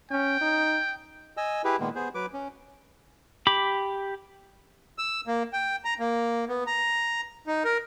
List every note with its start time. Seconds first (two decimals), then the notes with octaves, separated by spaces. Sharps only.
0.11 C#4 G5
0.41 D#4
1.37 D#5 G#5 E6
1.64 E4 G4 G#4 B4
1.80 A#2 D#3 G#3 A#3 B3
1.95 B3 G#4 C5
2.15 F#3 B4 D6
2.33 C#4
3.47 G4 B5 D6
4.98 E6
5.27 A#3
5.53 G5
5.85 A#5
5.99 A#3
6.49 B3
6.67 A#5
7.47 D#4
7.65 A#4